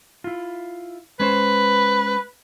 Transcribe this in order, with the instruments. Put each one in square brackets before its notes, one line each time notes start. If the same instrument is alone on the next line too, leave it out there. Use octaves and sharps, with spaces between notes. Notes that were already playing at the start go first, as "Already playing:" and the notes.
[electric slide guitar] E4 F4
[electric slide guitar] G#3 C#4 C5 [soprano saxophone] B4